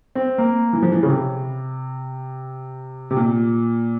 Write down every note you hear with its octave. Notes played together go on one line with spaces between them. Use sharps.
C4
A#3
E3
F3
E3
C#3
C3
C3
A#2